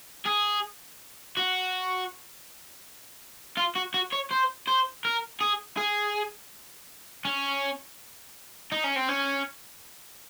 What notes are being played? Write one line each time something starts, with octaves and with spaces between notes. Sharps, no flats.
G#4
F#4
F4
F#4
F#4
C#5
C5
C5
A#4
G#4
G#4
C#4
D#4
C#4
C4
C#4